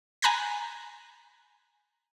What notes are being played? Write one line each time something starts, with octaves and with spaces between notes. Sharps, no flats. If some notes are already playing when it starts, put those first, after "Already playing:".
G#5 A#5 B5 F#6 G6 A#6